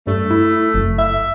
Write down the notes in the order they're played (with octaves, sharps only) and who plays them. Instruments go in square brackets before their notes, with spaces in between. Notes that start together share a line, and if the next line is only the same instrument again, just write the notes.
[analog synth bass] G2 [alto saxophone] A3
[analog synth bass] E4
F#1
[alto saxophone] E5